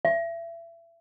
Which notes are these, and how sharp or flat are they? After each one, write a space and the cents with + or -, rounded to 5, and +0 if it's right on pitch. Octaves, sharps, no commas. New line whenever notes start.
E5 +30